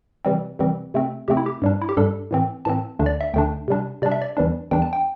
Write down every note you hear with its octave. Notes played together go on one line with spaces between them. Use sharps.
C3 E3 G3 C4
C3 E3 G3 C4
C3 A3 C4
C3 A3 C4 G4
E4
G4
G2 G3 D4
E4
G4
G2 G3 D4 A4
A2 E3 C4
A2 E3 C4 A5
D2 D3 A3 D4
D5
E5
D2 D3 A3 D4 G5
C3 G3 D4
C3 G3 D4 D5
E5
D5
E2 E3 G3 D4
E2 E3 G3 D4 G5
A5
G5